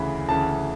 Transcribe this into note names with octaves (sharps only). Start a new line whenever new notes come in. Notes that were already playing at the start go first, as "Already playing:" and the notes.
Already playing: D2 C#3 E3 B5
D2 C#3 E3 A5